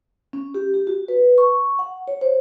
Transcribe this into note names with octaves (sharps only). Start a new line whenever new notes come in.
C#4
G4
G4
F#4
B4
C#6
F#5
C#5
C5